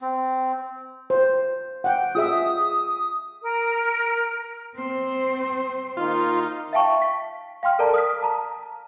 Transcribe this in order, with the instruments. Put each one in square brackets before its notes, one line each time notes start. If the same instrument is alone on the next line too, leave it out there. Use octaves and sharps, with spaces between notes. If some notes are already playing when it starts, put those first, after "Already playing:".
[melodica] C4
[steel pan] C5
F#5 G5
[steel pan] F4 G#4 E5 [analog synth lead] D#6
[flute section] A#4
[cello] C4 C5
[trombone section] D#3 A#3 D#4 [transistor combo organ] F4
[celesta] E5 F5 G5 A5 C#6
B6
F5 G5 C6 F6
A4 A#4 D5 A5 A#5
D#6 F6 B6
A5 A#5